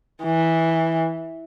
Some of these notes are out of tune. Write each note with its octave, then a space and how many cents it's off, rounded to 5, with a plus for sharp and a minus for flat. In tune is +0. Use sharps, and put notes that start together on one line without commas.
E3 -10